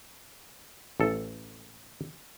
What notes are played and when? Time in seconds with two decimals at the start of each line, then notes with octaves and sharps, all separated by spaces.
1.00 A1 A4